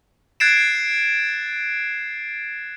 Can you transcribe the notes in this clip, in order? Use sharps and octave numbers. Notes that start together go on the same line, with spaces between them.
F#6 G#6 A6 C7 D7 E7